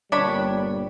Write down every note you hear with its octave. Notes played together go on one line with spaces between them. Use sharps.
G1 A#2 G3 D4 C#5 B5